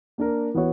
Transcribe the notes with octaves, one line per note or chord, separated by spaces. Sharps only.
A#3 D4 A#4
E3 B3 F#4 C#5